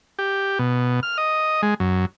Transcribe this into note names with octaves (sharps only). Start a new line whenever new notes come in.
G4
B2
F6
D#5
G#3
F#2